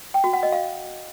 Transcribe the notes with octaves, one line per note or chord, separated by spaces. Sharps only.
G5
F#4
F#5
D#5
F5